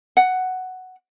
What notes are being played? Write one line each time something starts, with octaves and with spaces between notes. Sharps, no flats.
F#5